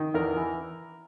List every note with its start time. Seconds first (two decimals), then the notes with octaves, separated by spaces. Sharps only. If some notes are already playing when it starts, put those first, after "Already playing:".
Already playing: D#3
0.14 E2 A#4
0.37 E3